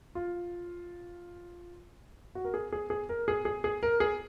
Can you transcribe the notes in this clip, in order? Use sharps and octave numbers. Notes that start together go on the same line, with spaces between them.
F4
F#4
A#4
G#4
G#4
G#4
A#4
G#4
G#4
G#4
A#4
G#4